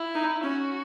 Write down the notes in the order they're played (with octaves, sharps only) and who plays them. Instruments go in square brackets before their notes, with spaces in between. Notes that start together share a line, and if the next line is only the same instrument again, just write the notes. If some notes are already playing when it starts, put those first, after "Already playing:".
Already playing: [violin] E4
[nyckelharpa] D#4
[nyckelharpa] C#4 [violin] F#4